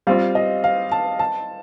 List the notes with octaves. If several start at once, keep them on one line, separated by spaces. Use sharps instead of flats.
G3 C4 F4 F5
D#5
F5
A5
A5